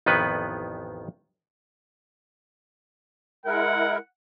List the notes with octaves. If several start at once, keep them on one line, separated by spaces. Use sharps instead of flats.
A1 F2 D#3 B3 B4
G#3 E4 A#4 F#5